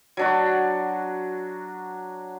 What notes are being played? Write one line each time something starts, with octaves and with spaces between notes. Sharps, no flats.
F#3 D4 F#4